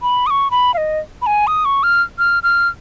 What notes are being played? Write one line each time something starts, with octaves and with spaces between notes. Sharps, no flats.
B5
D#6
C#6
B5
F5
D#5
B5
G#5
D#6
C#6
F6
F6
F6